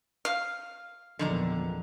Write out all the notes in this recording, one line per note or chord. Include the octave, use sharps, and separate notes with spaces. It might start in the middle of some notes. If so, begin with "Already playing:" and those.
F5
G#1 E2 A#2 D3 D#3 F3 F#3 A#5